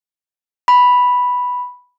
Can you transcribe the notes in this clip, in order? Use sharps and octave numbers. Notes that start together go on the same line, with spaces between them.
B5